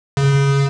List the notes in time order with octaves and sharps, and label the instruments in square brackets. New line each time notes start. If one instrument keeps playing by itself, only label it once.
[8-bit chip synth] C#3